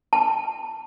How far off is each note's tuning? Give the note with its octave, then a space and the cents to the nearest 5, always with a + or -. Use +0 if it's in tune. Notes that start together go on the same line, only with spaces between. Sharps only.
A5 +5